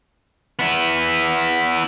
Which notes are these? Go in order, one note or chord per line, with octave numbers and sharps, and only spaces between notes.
B3 E4